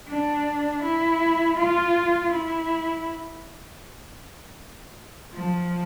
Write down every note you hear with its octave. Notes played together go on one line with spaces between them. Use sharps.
D4
E4
F4
E4
F3